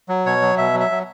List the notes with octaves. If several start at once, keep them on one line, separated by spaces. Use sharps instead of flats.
F#3
B2 C#5
F#3
B2 E5
F#3
E5
F#3